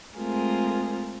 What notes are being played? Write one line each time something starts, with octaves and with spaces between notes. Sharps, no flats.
G#3 A3 C4 F4 G#4 A#4